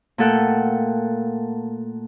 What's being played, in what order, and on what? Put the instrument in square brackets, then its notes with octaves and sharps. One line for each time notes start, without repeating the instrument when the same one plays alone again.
[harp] A#2 A3 A4 F#5 G5